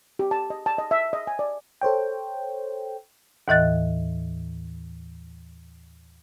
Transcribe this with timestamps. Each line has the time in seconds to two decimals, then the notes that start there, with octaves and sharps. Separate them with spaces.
0.19 G4
0.31 A5
0.50 D#5
0.66 A5
0.78 D#5
0.91 E5
1.13 D#5
1.27 G#5
1.39 D5
1.81 A4 C5 C#5 G5
3.48 D#2 A2 E3 D#5 F#6 A6